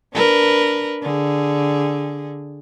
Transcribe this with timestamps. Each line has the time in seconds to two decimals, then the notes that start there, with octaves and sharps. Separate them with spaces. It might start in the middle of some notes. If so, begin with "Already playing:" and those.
0.13 D4 A#4 B4
1.02 D3 G#4